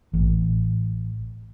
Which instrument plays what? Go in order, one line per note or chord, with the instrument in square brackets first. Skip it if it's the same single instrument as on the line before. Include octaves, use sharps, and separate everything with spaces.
[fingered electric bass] A1